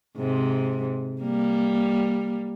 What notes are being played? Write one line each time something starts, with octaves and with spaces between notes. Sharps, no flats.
G#2 C3
G3 A#3